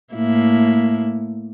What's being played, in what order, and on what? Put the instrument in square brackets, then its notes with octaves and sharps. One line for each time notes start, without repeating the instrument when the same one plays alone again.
[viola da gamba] A2 A#3 E4